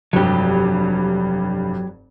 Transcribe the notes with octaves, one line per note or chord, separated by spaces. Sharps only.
F1 G2 F#3 G4